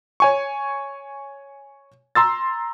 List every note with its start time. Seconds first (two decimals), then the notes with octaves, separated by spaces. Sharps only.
0.20 C#5 G#5 C#6
2.15 A#5 C6 E6 A6